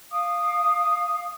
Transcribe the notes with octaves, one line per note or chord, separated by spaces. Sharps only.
F5 D6 D#6